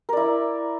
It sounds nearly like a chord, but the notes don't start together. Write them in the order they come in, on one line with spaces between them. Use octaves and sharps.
A#4 D5 E4